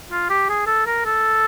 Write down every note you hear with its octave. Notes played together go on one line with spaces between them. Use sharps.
F4
G4
G#4
A4
A#4
A4